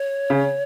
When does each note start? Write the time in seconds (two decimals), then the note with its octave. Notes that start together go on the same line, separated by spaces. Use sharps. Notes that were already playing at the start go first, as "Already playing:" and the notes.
Already playing: C#5
0.30 C#3